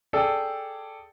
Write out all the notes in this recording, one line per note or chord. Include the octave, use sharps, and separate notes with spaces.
G#4 A4 D5 G5